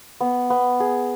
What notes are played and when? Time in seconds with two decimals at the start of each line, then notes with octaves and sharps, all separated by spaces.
0.21 B3
0.50 B3
0.80 G#4